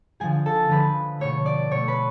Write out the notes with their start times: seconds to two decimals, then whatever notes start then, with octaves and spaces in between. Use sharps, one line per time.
0.20 D3 F3 G#3 G#4 G#5
0.46 A4 A5
0.69 D3 F3 G#3 B4 B5
1.19 B2 A3 C#5 C#6
1.46 D5 D6
1.71 B2 A3 C#5 C#6
1.88 B4 B5